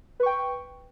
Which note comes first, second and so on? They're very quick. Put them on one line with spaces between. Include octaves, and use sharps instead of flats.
B4 C#6 G5